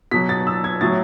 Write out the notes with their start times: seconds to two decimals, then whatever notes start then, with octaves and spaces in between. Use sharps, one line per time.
0.11 B2 F#3 B6
0.29 A6
0.47 E6
0.64 G#6
0.81 A2 F#3 A6